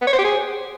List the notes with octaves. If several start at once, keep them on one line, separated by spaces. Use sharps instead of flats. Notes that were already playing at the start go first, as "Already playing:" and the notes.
B3
C#5
C5
G4
G#4